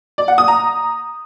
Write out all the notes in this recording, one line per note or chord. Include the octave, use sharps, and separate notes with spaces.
D5
F#5
D#6
A#5